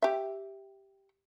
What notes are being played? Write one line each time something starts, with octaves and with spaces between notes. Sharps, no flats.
G4 E5